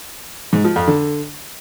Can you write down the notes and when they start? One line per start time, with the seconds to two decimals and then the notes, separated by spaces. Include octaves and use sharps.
0.53 G#2
0.64 F3
0.76 F2
0.88 D3